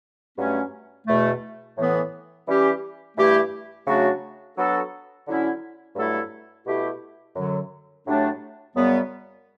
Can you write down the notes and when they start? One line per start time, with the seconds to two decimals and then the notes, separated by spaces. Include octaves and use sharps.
0.37 G2 F#3 A3 C#4
1.07 E2 B2 A3
1.77 A2 E3 B3
2.47 E3 G3 C#4 G4
3.16 G2 E3 A3 E4 G4
3.86 C#3 F#3 A3 D4 F#4
4.56 F#3 B3 D4 F#4 A4
5.26 D3 F#3 C#4 E4
5.96 G2 F#3 A3 E4 A4
6.66 B2 A3 E4 G4
7.35 F#2 D3 F#3
8.05 A2 F#3 A3 D4 G4
8.75 F#2 C#3 G3 B3